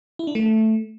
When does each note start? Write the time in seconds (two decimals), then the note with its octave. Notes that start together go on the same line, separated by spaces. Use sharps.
0.19 E4
0.27 D4
0.35 A3